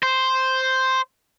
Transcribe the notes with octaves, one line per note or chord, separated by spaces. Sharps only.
C5